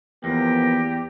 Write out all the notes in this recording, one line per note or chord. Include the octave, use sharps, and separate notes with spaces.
E2 F3 A#3 B3 G4 A#6